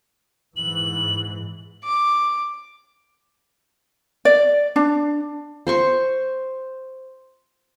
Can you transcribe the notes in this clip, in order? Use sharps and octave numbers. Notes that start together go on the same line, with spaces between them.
G#2 E3 F#7
D6
D5
D4
C5 C6 C#6